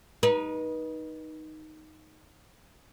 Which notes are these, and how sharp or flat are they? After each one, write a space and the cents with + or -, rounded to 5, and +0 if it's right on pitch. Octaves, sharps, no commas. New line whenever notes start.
D#4 +0 B4 -35